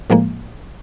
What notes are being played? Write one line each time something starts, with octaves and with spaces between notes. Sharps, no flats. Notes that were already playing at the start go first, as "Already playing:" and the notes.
A2 F3 G#3 A#3